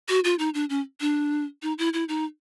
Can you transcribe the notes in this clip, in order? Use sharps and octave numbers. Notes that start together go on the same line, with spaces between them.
F#4
F4
D#4
D4
C#4
D4
D#4
E4
E4
D#4